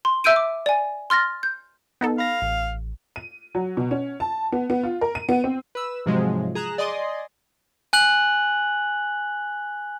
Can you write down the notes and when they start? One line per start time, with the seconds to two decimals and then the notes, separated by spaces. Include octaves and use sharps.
0.05 C6
0.24 E5 E6 G6 D7 D#7
0.36 D6
0.66 D5 G#5
1.10 C6 F6 A6 A#6
1.43 G6
2.01 B3 D#4 A4
2.18 F5 B5 A#6
2.42 A1
3.16 D#7
3.55 F#3
3.77 B2
3.91 C#4
4.20 A5
4.52 B3
4.70 B3
4.83 F4
5.01 A#4
5.15 D#7
5.29 B3
5.44 C4
5.75 B4 E6
6.06 G#2 C3 F3 F#3 G#3
6.55 G#4 A#5 F#6 E7
6.78 D5 D#5 G#5 C6 D#6
7.93 G#5 F#6 F#7